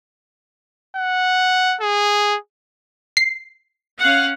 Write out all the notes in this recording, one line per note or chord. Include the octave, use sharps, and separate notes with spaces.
F#5
G#4
C7
C#4 F5 F#5